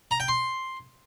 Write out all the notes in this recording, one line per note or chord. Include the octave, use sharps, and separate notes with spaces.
A#5
G5
C6